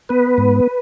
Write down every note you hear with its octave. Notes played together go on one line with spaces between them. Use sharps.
B3 B4
G#2